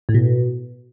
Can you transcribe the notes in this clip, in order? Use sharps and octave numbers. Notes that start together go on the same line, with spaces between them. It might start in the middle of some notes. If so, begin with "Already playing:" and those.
A2
B2